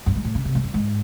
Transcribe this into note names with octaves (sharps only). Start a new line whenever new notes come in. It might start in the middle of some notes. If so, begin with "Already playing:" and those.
F#2
G#2
A2
C#3
C3
G#2
F#2
G#2